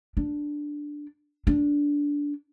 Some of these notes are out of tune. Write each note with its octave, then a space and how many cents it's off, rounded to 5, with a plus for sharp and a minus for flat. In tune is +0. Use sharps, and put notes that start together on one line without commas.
D4 +0
D4 -15